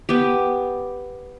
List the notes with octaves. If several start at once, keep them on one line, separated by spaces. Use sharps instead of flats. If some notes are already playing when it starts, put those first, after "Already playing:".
B3 G4